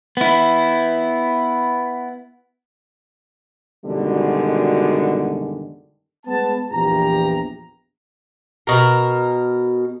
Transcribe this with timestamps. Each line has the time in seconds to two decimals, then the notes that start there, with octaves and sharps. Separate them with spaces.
0.17 B3 E4
3.86 F#2 B2 D3 D#3 G3 G#3
6.26 G#3 B3 A5
6.72 A#1 E2 E3 G4 A#5
8.67 B2 A#4